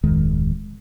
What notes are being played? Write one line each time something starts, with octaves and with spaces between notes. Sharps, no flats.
D1 F2 D#3 G#3